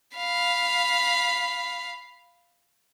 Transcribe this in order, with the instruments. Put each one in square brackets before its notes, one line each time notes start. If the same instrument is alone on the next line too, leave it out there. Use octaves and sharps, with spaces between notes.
[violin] F5 B5